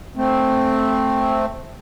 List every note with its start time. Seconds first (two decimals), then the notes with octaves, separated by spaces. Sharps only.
0.16 A3 C4